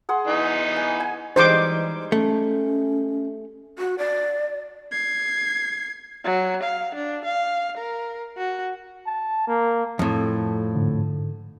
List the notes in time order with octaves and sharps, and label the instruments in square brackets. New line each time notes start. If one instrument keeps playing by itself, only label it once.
[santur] G#4 F#5 C6
[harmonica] E3 B3 D#4
[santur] G#5
G#5
[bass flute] E3 [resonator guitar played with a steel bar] G3 G#3 D#4 [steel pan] C5 D6
[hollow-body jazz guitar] A3 [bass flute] C#4
[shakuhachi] F#4
D5
[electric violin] G#6 C7
[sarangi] F#3
F5
D4
F5
A#4
F#4
[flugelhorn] A5
A#3
[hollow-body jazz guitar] F2 A2
[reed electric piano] G#2 D3